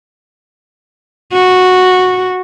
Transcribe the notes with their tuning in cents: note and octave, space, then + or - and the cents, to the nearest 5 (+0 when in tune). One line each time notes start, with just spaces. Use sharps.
F#4 -10